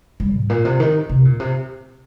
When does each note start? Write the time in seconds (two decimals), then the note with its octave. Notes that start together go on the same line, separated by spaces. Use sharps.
0.20 G3
0.35 G#2
0.50 A#2
0.65 C3
0.80 D#3
1.09 C3
1.25 A#2
1.40 C3